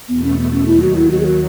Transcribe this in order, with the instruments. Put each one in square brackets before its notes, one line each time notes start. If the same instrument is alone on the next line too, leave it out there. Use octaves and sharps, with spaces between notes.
[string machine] E2 B2 A3 [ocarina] B3
[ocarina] C#4
B3
C#4
[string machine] D#2 D#3 F#3 [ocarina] E4
[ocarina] F#4
E4
F#4
G#4
F#4